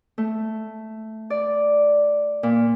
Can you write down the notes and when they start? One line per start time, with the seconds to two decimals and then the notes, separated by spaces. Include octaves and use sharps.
0.18 A3
1.30 D5
2.43 A#2